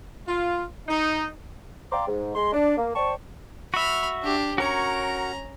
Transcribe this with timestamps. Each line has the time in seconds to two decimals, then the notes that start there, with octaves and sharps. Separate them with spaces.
0.28 F4
0.88 D#4
1.92 D5 F5 G5 A#5 C6 D6
2.08 G#2
2.35 G#3 C6
2.53 D4
2.78 A#3
2.95 C5 D5 G5 A5 C#6
3.74 F#4 E5 B5 F6
4.23 D4 G4
4.58 C#4 F#4 A#4 C#5 A#5